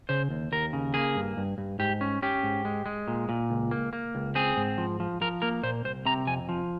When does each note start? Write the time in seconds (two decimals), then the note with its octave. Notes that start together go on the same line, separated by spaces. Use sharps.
0.09 C#3 C5
0.30 D#2
0.52 D#2 A#4
0.73 C#3
0.94 A#3 G#4
1.16 G2
1.37 G2
1.58 G2
1.79 G#2 G4
2.01 C#4
2.22 C#4 G4
2.43 G#2
2.65 G#3
2.86 G#3
3.08 A#2
3.29 A#2
3.50 C#2
3.71 A#3
3.93 A#3
4.15 C#2
4.35 C4 G#4
4.57 G#2
4.78 F3
5.00 F3
5.21 F3 A#4
5.42 A#3 A#4
5.63 A#2 C5
5.84 C2 C5
6.05 C3 A#5
6.27 F2 G#5
6.49 F3